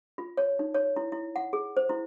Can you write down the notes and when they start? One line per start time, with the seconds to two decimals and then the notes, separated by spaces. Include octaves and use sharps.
0.18 F4
0.37 C#5
0.59 D#4
0.74 C#5
0.96 E4
1.12 E4
1.36 F#5
1.53 G#4
1.77 C5
1.89 E4